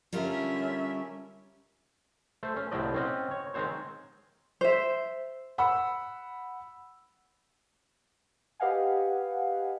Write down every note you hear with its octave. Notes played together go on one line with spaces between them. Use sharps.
D3 G3 C#4 F4 A#4 E5
A3 C5
C#4
C2 A2 C5 D5 D#5
C4 C#4 D#5 F#5
C#5
D#3 G#3 C4 C5 C#5
C5 E5
F#5 B5 E6
G4 B4 D#5 F5 F#5 G#5